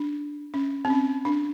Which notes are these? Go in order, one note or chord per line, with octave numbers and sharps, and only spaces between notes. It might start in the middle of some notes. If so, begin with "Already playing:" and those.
Already playing: D4
C#4
C4
C#4
D4